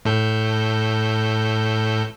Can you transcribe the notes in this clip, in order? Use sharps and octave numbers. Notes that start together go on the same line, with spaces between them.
A2 A4 G6